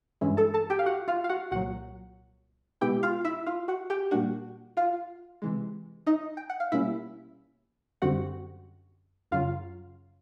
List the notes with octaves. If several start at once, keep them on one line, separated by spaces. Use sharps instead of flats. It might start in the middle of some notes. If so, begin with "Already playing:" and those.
G2 E3 G#3 C#4 E4
A4 A5
A4 A5
G4 G5
F5
F#4 F#5
F4 F5
F5
F#4 F#5
C2 A#2 F#3 F#4 F#5
B2 G#3 B3 E4 G4 G5
F4 F5
E4 E5
F4 F5
F#4 F#5
G4 G5
A#2 G3 A#3 D4 F#4 F#5
F4 F5
C3 E3 G#3
D#4 D#5
G5
F#5
F5
B2 G3 A#3 C#4 E4 E5
F#2 D3 G3 C4 F#4 F#5
F#2 C#3 F#3 F4 F5